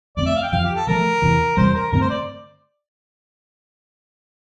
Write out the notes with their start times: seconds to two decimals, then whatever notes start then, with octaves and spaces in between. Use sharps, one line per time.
0.17 F2 D3 A3 C4 D5
0.26 E5
0.35 F5
0.43 G5
0.52 F2 D3 F3 F5
0.64 G4
0.75 A4
0.87 D3 F3 A3 A#4
1.22 E2 C3 E3
1.57 E2 C3 G3 C5
1.74 A#4
1.92 G2 D3 A3 C4 A#4
2.01 C5
2.10 D5